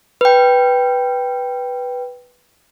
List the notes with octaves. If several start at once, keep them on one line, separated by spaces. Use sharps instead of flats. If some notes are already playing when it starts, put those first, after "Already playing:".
B4 G5